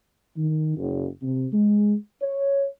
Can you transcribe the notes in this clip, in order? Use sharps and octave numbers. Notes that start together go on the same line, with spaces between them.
D#3
F#1
C3
G#3
C#5